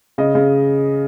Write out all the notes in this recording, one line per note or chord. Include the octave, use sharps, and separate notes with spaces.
C#3 D#5
C#3